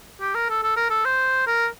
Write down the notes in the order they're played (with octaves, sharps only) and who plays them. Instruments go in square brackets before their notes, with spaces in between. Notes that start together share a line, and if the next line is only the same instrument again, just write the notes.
[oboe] G4
A#4
A4
A4
A#4
A4
C5
A#4